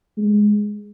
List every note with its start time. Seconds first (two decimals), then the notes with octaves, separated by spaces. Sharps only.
0.17 G#3